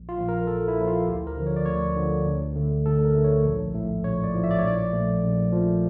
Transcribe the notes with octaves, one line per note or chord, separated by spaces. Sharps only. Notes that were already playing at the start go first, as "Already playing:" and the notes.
Already playing: A#1
F4
A#2 F3
A#4
A#1 A4
E4
A#2 F3
F4
D2 G4
A#4
D3 F3
C#5
D5
D2 C#5
D3 F3
D2
D3 A3
D2 A4
A#4
D3 A3
C#5
A#1
A2 F3 A3
A#1 C#5
D5
A2 F3 A3
E5
D5
C#5
A#1 D5
A#2 F3 A3
A#1
A#2 F3 A3